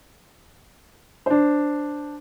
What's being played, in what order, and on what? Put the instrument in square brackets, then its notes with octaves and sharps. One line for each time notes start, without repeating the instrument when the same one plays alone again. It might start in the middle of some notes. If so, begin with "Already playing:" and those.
[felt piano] D4 C5